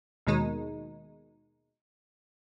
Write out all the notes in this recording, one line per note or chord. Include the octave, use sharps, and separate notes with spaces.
D#2 B2 D#3 G#3 D#4